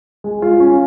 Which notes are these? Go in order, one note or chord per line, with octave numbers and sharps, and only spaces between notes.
G#3
F4
C#4